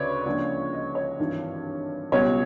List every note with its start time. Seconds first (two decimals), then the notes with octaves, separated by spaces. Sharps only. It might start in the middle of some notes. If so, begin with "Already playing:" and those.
Already playing: D2 C#3 B4 C#5 D5
0.26 C#2 C#3 F3 A#3 D4
0.73 D#5
0.95 C#5
1.19 G#1 G2 E3
2.12 C#2 B2 G3 C#5